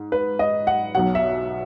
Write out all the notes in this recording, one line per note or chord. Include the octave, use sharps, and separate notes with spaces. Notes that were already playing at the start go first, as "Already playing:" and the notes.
Already playing: G#2
B4
D#5
F#5
B1 B2 F#3 F#5
E5